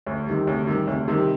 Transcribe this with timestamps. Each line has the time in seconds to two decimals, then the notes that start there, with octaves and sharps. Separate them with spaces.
0.06 D2
0.27 C3 D#3 G3
0.47 D2
0.67 C3 D#3 G3
0.87 D2
1.08 C3 D#3 G3